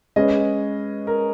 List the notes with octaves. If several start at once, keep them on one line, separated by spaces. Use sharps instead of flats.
G#3 C#4 G#4 B4 D#5
A#4